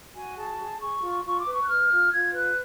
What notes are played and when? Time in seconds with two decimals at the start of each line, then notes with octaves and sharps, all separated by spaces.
0.14 F#4 G#5
0.36 G#4 A5
0.58 G#4
0.80 G#4 C#6
1.01 F4
1.24 F4 C#6
1.38 D6
1.45 B4
1.53 C#6
1.60 F#6
1.67 B4 F6
1.90 F4
2.11 F4 G#6
2.33 B4 F#6